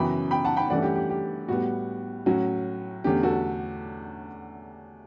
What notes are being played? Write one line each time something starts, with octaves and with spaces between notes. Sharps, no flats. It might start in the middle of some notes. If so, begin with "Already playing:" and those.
Already playing: F#2 C#3 E3 B3 G5 B5
G5 B5
F#5 A5
G5 B5
G2 E3 A3 C#4 D5 F#5
G4
G4
G4
A2 G3 B3 F#4
A2 F#3 C#4 F#4
E2 D3 A3 C#4 G4
F#4 A4